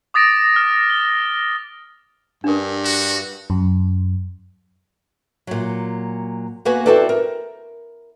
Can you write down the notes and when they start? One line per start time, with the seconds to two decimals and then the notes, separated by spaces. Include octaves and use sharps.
0.14 D6 D#6 A6 A#6 D7
0.56 F6
0.90 G7
2.44 G2 D4 A#4
2.85 F#4
3.50 F#2
5.47 A#2 F#3
6.65 A#3 B3 F#4 B4 G#5
6.86 C4 E4 F#4 A4 B4 D5
7.09 A#4